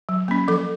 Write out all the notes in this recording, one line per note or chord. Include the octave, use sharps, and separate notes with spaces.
F#3
A#3 C#4
F3 A4